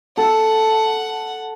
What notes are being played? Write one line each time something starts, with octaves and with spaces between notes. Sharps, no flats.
A4 F#5